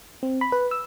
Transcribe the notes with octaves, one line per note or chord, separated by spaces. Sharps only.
C4
B5
B4
E6